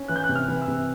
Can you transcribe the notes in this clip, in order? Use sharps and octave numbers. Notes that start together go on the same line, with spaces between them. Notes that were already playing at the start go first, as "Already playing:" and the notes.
Already playing: C#4
E3 F#6
G6
F#6
C3
F6
E3
E6
C3